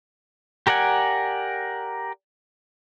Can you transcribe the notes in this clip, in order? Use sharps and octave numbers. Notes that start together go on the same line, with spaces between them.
G4 A#4 D5 F#5 G#5